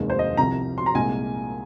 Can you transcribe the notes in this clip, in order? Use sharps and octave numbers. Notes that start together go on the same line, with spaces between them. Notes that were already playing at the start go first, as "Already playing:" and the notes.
Already playing: F1 D#2 D#3 G#3
C5
D#5
C2 C3 F3 A#5
C6
A#5
C2 A#2 G#3 G#5